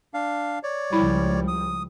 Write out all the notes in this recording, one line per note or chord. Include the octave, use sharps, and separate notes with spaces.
D4 F5
C#5 D5
C#2 F3 G3 E4 B5
D#6